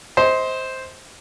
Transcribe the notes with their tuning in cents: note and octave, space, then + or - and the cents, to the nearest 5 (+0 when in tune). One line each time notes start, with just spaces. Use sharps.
C5 +0 D#5 +35